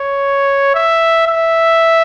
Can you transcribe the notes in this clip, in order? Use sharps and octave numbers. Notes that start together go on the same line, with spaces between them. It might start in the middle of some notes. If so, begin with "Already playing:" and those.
Already playing: C#5
E5
E5